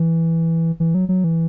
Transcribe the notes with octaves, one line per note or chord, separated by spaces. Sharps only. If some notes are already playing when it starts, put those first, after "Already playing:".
Already playing: E3
E3
F#3
F#3
E3